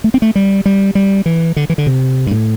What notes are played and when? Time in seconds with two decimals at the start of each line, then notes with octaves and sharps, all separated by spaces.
0.04 A3
0.14 C4
0.22 A3
0.35 G3
0.66 G3
0.95 G3
1.26 E3
1.56 D3
1.70 E3
1.78 D3
1.87 C3
2.27 G2
2.31 A2